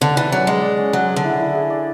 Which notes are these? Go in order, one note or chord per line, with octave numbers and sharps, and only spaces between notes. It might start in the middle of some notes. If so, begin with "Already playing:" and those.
D3 D5
E3 D5
F#3 C#4
G#3 D5
D5
C#4
F#3 G#4
G#4
D3
E4
E4
G#4
D5